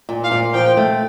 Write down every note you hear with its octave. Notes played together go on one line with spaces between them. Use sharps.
A#2
F5
A#2
F3 G5
A3